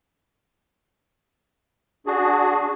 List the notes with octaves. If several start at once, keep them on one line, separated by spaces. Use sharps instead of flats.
D4 F#4 G#4